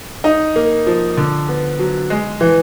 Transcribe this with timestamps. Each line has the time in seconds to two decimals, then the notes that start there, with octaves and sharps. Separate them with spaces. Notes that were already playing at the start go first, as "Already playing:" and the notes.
0.24 D#4
0.56 A#3
0.87 F3
1.17 D3
1.49 B3
1.79 F#3
2.10 G#3
2.41 E3